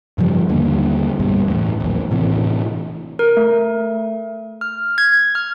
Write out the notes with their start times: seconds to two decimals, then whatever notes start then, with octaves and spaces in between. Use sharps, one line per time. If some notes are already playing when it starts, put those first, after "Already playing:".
0.18 G2 C#3 F3 G3
0.49 D#2 D3 G3 A#3
1.19 B1 G2 B2 G3
1.48 E2 A2
1.80 A#1 D#2
2.11 A2 C3 E3
3.19 A#4
3.37 A3
4.61 F6
4.98 G#6
5.35 F6